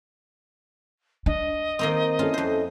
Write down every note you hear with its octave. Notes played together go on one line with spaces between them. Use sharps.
D4 D#5
D#3 A#3 C4
C#4 E4 F4 A4
F2 C5